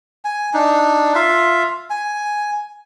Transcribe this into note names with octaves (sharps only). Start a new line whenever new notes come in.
G#5
D4 D#4
F4 E5 F5
G#5